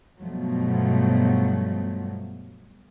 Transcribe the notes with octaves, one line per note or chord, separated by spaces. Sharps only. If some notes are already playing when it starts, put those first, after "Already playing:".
G2 B2 F3 F#3 A3